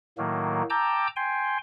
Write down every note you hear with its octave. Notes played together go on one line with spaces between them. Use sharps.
A2 D#3 F#3 A#3
G5 A5 A#5 D6 E6 G6
G5 G#5 C6